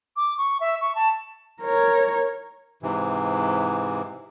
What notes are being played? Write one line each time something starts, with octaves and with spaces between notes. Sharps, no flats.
D6
C#6
E5
C#6
A5
A#4 C#5
G#2 C3 E3